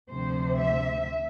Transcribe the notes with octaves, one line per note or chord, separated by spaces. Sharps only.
D2 C3 F3 C5
E5